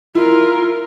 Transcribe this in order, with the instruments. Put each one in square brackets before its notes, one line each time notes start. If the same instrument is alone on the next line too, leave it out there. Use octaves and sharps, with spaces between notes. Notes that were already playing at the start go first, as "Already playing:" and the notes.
[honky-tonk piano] E4 [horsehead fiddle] F4 A#4